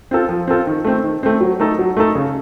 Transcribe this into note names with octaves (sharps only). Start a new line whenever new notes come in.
C4 F4 A4
F3
C4 F4 A4
D#3
A3 C4
D#3
A3 C4
F#3
A3 D#4 A4
F#3
A3 D#4 A4
C#3